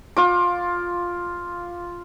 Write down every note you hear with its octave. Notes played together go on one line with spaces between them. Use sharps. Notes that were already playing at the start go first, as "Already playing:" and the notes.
F4 D6